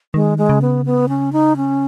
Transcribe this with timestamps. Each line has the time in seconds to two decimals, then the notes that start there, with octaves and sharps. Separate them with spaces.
0.14 D#3 G#3
0.38 G#3
0.49 C#3
0.62 B3
0.86 B3
1.09 C#4
1.33 D#4
1.57 C#4